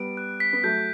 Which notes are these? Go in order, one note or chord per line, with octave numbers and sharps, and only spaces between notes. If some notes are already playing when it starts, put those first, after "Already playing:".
Already playing: G3 B3 D7
F#6
B6
B3
F#3 A3 G6